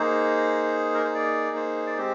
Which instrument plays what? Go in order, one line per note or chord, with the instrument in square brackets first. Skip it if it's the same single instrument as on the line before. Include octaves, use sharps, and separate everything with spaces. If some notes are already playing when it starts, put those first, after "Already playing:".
Already playing: [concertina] A#3 D#4 G#4 C5
A#4
C5
D5
C5
D5
G#3 C4 G4 C5